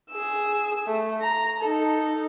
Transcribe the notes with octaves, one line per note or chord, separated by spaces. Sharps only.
G#4 E6
A3
A#5
D#4 A4